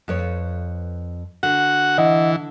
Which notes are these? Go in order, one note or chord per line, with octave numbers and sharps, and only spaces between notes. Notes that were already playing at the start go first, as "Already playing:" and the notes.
F2 B4 C#5
D3 F#4 F#5
E3 D#5 F#5